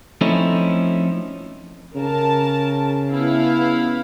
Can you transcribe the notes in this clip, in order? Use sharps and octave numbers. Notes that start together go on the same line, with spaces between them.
F3 A3 C4 C#4 D#4 E4
C#3 A#4 A5
B3 E4 F5